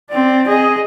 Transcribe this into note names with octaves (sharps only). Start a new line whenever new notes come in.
C4 D5
G#4 D#5